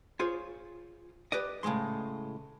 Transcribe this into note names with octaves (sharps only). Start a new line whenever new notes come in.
F4 G#4 C5 C#5
G4 B4 D5 D#5
A2 C#3 E3 G#3 C6